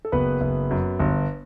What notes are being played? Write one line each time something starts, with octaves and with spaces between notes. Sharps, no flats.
A4
F#1 B3 B4
F#1
F#2
G1